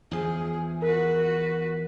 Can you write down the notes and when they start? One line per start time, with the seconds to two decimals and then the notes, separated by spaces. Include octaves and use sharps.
0.11 E2 F3 G#4
0.82 F#4 A#4 B4